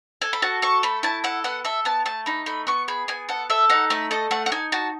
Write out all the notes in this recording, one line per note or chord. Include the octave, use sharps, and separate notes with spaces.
A4 G#5
B5
F#4 A5
A4 C#6
A3 B5
E4 A5
A4 F#5
B3 F#5
A4 E5
B3 A5
A3 A5
D#4 B5
A3 B5
B3 C#6
G#4 B5
B3 G#5
A4 F#5
A4 E5
D#4 F#5
A3 E5
A4 D#5
A3 F#5
F#5
D#4 G#5
F#4 A5